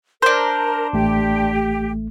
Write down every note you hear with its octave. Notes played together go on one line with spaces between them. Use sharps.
D4 A#4 C5
A1 A3 G4